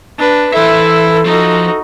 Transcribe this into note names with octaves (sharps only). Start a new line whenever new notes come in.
D4 B4
E3 E4 A4 C5 E5
F3 D#4 F#4